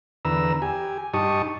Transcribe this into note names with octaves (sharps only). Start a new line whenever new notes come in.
E2 D3 B4 A#5 E6
G4 G#5
G2 D#4 G4 A5 C#6 D#6